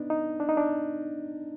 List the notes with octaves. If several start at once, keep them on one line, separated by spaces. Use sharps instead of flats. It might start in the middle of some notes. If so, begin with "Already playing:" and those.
Already playing: B3 D4 D#4
D#4
D4
D#4
D4